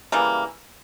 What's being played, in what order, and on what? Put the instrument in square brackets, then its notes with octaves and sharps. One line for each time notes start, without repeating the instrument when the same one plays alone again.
[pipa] C#3 E3 G3 A#3